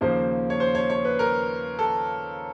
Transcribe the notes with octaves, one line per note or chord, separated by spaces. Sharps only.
D#2 C#3 F3 A#3 C5
C#5
C5
C#5
C#5
B4
A#4
A4